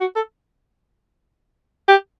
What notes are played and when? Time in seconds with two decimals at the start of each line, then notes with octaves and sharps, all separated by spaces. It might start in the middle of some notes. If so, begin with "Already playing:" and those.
0.01 F#4
0.16 A4
1.88 G4